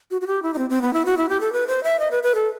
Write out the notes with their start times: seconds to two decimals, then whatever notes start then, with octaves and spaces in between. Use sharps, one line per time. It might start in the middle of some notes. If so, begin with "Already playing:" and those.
0.11 F#4
0.21 F#4
0.27 G4
0.43 E4
0.54 D#4
0.58 C4
0.70 C4
0.82 B3
0.93 E4
1.05 F#4
1.17 E4
1.29 G4
1.40 A4
1.53 B4
1.67 C5
1.84 E5
1.99 D#5
2.11 B4
2.23 B4
2.35 A4